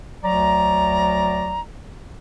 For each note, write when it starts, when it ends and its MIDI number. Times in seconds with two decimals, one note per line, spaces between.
0.24 1.61 38
0.24 1.61 54
0.24 1.61 74
0.24 1.61 82